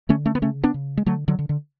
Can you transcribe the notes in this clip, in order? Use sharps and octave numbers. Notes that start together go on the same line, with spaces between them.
D3 A3 C#4
A3 C#4
B3
C#3 A3 C#4
B3 D4
C#3
G#3
D3 F#3 A3
D3 F#3
D3
D3